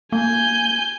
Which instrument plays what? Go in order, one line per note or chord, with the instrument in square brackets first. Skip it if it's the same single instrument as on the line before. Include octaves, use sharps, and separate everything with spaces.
[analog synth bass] A#3 [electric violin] G#5 G6